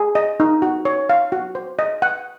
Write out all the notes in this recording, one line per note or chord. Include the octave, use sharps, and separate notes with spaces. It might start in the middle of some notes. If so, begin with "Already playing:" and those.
Already playing: G#4
D#5
D#4
F#4
C#5
F5
F#4
C5
D#5
F#5